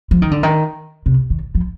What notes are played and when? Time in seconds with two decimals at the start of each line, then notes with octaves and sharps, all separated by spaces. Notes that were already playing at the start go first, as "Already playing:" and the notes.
0.11 F3
0.22 D#3
0.31 D3
0.43 D#3
1.06 C3
1.30 D#3
1.55 F3